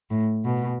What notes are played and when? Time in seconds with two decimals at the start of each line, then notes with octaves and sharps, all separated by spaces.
0.10 A2
0.45 B2